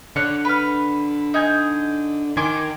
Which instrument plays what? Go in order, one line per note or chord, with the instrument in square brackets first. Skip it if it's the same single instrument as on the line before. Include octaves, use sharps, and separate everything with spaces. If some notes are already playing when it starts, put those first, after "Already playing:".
[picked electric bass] D3 [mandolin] C#5 D5 F#6
[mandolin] B4 F6
D#4 G#5 G6
[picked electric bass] D#3 [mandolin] G#5 C6 D6